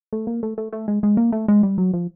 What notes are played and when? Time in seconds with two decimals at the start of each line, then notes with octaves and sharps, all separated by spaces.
0.13 A3
0.27 A#3
0.43 A3
0.58 A3
0.73 A3
0.88 G#3
1.03 G#3
1.17 A#3
1.32 A3
1.48 G#3
1.63 G3
1.78 F#3
1.93 F3